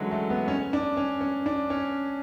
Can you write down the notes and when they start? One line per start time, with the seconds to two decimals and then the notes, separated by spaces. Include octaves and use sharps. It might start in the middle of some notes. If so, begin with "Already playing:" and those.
Already playing: D3 E3 F#3 G#3 C#4
0.11 A3
0.30 B3
0.48 C#4
0.73 D4
0.97 C#4
1.21 C#4
1.46 D4
1.70 C#4